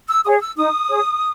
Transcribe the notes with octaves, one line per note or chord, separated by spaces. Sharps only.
E6
G#4 C#5 D#6
D#6
E6
D#4 D#6
G#4 C#5